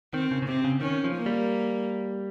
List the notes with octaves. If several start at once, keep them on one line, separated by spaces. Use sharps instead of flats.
D#3 C4
C#3
C#3
C3 C4
C#3
D#3 C#4
F3
A#3
G3